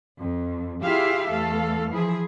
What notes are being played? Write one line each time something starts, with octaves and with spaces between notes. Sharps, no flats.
F2
E4 F4 G4 G#4 E5 F5
E2 A3 A4 F5
E3 F3 E4 G#4